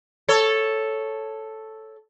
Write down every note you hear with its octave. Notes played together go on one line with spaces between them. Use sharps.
A4 C#5